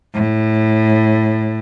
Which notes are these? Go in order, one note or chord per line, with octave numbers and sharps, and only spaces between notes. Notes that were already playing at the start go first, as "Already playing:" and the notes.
A2